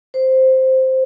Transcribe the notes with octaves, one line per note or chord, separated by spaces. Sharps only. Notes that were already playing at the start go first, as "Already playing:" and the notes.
C5